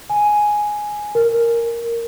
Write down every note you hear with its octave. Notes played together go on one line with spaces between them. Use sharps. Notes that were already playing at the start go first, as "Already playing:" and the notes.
G#5
A#4